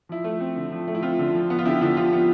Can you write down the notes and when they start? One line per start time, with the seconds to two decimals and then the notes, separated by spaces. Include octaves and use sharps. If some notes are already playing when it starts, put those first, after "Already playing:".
0.09 F3 E4
0.24 A3
0.40 C4
0.56 D3
0.72 F3
0.87 A3
0.95 E4
1.02 C4 F4
1.19 D3
1.35 F3
1.50 B3
1.59 F4
1.65 D3 E4 G4
1.81 D3 E4
1.97 F3 F4
2.12 B3